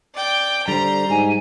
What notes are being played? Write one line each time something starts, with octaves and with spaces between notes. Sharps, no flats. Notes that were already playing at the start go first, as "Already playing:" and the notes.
D5 G5
D3 G3 C5 A#5
G#2 G#5